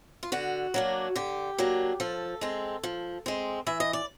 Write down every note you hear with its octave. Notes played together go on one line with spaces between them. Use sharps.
F4
D3 F#4
F#3 A#3 D4
D3 G4
F#3 A#3 D4
F3 A4
G#3 C4
F3
G#3 C4
E3 E5
D#5
D5